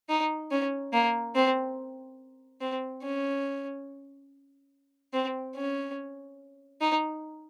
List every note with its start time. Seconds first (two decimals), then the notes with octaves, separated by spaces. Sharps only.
0.09 D#4
0.51 C#4
0.93 A#3
1.35 C4
2.61 C4
3.03 C#4
5.13 C4
5.56 C#4
6.81 D#4